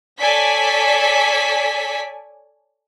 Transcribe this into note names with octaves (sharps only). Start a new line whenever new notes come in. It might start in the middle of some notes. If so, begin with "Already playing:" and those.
A4 C#5 D5 G#5 B6